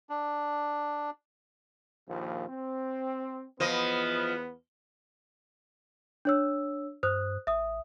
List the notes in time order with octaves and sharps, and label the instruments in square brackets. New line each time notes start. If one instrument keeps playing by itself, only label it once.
[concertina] D4
[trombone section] A#1 D#2 F3
C4
[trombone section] E2 B3 [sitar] F3 D#5
[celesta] D4 C#5 E6
[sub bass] G2 [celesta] C5 D#6 F#6
[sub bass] A1 [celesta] E5 D#6